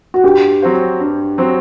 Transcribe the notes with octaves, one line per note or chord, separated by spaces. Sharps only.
F#4
G2 G4
F#3 C4 F#4 C5
G2
F#3 C4 F#4 C5